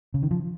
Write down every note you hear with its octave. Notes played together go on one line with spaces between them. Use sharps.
C#3
D#3
F3